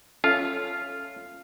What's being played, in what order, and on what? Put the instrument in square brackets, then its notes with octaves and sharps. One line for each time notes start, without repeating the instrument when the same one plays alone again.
[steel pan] C#4 C#5 E5 [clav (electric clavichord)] F4 [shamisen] A4 [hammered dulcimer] F5